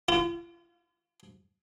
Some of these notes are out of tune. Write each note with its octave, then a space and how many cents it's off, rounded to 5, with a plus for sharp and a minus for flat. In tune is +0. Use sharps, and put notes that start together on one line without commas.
F4 -40